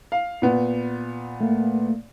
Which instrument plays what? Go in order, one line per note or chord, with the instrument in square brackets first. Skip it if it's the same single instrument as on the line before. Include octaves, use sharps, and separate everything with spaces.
[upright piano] F5
A#2 B3
[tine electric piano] A3 A#3